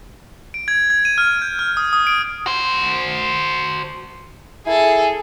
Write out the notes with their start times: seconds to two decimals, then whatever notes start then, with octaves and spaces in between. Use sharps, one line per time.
0.54 D7
0.68 G#6
0.90 G#6
1.05 D#7
1.18 F6
1.42 G6
1.59 F6
1.77 D#6
1.93 D#6
2.07 D7
2.46 F#4 C5
4.67 E4 G#4 A4